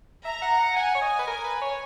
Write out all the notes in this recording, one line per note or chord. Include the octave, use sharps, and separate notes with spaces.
E5 A#5
F#5
F#5
F#5 G#5
C#5
D#5
B4
A#4
B4
C#5